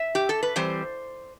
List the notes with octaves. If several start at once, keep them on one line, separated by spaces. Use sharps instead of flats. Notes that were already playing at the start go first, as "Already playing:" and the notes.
Already playing: E5
G4
A4
B4
E3 G3 C4 C5